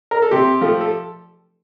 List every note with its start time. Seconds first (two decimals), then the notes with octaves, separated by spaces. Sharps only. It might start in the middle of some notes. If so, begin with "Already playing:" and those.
0.11 A#4
0.22 A4
0.31 C3 G4
0.61 F3 A3
0.81 A4